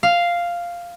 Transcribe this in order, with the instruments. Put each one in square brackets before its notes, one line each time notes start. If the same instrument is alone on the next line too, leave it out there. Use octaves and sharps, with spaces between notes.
[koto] F5